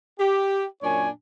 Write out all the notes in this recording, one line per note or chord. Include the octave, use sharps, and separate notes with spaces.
G4
F#2 A#2 D4 C#5 G#5